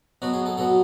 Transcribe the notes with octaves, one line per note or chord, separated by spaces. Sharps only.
B2 F#3 B3 F#4
G#4
A4
B2 F#3 B3 A4